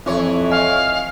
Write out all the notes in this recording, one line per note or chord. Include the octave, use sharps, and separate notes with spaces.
F2 E3 C#5
D#5 F5 G#5